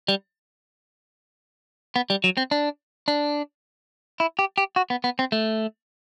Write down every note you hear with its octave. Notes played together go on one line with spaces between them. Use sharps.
G3
B3
G3
F#3
C4
D4
D4
E4
G4
G4
F#4
B3
B3
C4
A3